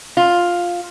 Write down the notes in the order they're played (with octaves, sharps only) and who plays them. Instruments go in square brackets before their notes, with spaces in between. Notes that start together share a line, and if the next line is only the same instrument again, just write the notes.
[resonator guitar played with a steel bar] F4